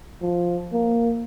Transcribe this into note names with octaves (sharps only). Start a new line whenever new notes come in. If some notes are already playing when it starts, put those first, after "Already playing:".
F3
A#3